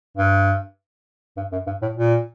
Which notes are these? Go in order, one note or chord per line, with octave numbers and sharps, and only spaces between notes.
G2
G2
F#2
G2
A2
A#2